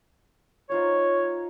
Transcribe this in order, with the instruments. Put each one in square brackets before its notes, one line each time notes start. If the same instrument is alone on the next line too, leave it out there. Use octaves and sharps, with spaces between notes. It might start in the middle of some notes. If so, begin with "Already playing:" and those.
[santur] D#4 F4 C5 [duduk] C#5